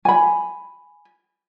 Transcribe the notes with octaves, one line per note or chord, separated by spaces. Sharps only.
G#5 B5